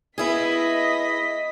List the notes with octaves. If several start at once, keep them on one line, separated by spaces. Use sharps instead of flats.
B3 E4 G#4 D#5 B6